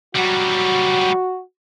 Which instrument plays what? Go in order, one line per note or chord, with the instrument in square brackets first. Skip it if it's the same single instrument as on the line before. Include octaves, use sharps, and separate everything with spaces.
[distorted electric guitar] F#3 G3 [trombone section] F#4